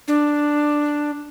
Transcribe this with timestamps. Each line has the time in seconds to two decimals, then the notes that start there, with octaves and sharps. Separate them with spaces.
0.08 D4